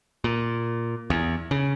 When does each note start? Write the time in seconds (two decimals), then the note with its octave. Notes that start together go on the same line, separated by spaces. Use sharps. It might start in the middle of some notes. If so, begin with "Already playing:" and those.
0.24 A#2
1.10 E2
1.51 C#3